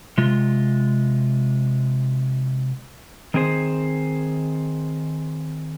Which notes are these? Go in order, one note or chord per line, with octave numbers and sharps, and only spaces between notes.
C3 G#3 F4
D#3 C4 G#4 C5